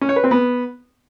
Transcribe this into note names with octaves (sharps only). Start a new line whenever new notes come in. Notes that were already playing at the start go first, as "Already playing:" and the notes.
C#4
C#5
B4
C4
B3